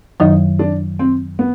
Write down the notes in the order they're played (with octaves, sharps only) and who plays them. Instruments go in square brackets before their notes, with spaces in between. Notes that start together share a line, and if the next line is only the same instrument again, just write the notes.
[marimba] F#2 D#3 F#3 [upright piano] D#4
[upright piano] D4
C4
B3